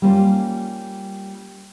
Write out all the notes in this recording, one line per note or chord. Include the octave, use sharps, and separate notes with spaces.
G3 A#3 C#4 F4